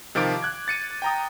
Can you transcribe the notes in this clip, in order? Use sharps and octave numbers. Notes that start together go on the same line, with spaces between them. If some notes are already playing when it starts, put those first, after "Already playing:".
C3 D#3 F3 F5 D6 D7
F#6 G#6
A6 C#7 D#7
G5 A#5 D#6